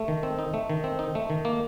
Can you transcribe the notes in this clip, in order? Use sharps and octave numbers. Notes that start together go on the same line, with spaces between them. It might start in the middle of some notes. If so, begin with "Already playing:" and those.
Already playing: A3
D#3
C4
D#4
A3
D#3
C4
D#4
A3
D#3
A#3